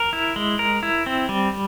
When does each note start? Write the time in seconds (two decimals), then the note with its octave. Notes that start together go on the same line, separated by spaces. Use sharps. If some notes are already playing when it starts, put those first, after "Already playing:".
Already playing: A#4
0.13 E4
0.36 G#3
0.59 A#4
0.83 E4
1.06 C4
1.29 G3